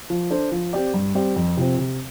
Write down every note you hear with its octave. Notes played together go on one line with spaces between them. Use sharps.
F3
D4 A4 C5
F3
C4 G4 D5
G2
G3 C4 G4 D5
F2
C3 F3 C4
C3